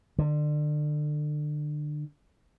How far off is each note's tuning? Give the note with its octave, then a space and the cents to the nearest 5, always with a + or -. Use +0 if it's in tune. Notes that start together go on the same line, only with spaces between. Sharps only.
D3 +30